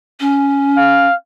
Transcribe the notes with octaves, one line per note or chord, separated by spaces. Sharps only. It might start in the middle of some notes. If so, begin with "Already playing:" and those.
C#4
F5